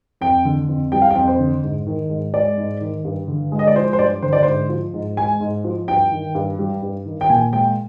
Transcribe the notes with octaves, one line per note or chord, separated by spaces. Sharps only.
F2 G5
D3
F2
G3 G5
F5
G5
F2
C5
D3
G#2
D#3
G#2
G#3 D5
G#2
D#3
G2
D3
G#3
D#5
D5
F3 C5
C5
G2 D5
D3 C5
D5
G#2 C5
F3
G#2
G#3 G#5
G#2
F3
G2 G5
D#3
G2
G3
G2
D#3
G5
A#2 G#5
G#3 G5